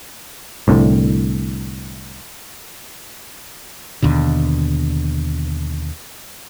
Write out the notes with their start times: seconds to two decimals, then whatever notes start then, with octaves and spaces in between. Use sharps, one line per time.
0.68 C2 A2 D3
4.02 D#2 B2 D3